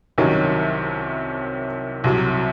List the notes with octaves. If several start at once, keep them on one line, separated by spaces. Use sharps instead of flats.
C2 C3 D#3 F#3 C#4
C2 C3 F#3